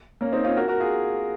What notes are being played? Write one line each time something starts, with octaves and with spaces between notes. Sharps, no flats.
A#3 C#4
C4 D#4
C#4 F4
F#4 A#4
F#4 A#4
F4 G#4